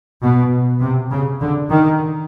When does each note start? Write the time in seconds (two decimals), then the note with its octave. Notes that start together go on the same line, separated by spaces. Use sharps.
0.22 B2
0.81 C3
1.11 C#3
1.40 D3
1.69 D#3